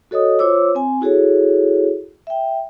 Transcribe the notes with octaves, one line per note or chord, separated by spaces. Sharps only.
F#4 A4 C#5 D#5 D#6
F4 C5 C#5 D6 E6
C4 G#5
E4 F#4 G#4 A4 C#5
E5 G5